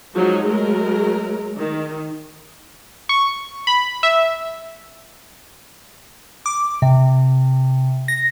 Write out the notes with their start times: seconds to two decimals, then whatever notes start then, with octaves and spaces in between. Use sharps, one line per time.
0.14 F3 F#3 G#3 D#4
0.44 F#3 G#3 A3 A#4
1.57 D#3
3.09 C#6
3.67 B5
4.03 E5
6.46 D6
6.82 C3
8.08 A#6